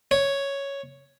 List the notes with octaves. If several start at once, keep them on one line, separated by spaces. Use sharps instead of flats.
C#5